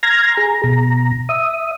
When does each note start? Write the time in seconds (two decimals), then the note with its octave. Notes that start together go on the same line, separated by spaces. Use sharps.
0.03 A#5 C6 F6 G#6 A#6
0.37 G#4 A#5
0.64 B2 A#5
1.29 E5 D#6